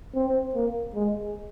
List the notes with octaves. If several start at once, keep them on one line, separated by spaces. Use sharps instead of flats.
C4
A#3
G#3